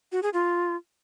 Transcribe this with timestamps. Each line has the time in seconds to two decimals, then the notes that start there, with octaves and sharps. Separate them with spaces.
0.12 F#4
0.23 G#4
0.33 F4